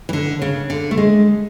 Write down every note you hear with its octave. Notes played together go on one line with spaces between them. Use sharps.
E3
D3
C#3
D3
A3
G#3